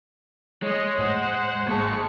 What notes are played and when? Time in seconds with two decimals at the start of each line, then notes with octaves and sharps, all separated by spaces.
0.62 G#3 C#5 D#5
0.97 E2 A2 C5 F#5
1.68 G#1 G#3 A#3 A5 C#6